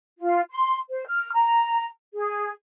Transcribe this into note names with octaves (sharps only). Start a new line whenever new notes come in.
F4
C6
C5
F6
A#5
G#4